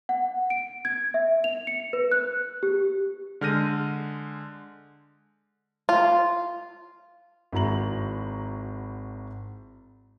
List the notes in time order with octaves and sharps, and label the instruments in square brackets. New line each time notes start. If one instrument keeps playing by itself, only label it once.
[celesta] F#5
D7
G#6
E5
F7
C#7
B4
F#6
G4
[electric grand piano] D3 G#3 F6 G6 A#6 D#7
[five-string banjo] F4
[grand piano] G#1 E4 F#4 A#5 F#7